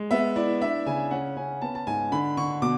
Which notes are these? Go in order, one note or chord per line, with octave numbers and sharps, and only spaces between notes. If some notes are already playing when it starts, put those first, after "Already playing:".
Already playing: G#3
B3 E5
E4 D5
D4 E5
C#3 G#5
C#4 F#5
C#4 G#5
B3 A5
A5
G#2 G#5
D3 B5
D3 C#6
B2 D6